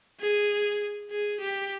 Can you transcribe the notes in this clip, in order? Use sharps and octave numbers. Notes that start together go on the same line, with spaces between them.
G#4
G#4
G4